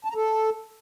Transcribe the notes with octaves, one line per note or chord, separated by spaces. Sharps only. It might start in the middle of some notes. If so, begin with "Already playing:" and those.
A5
A#5
A4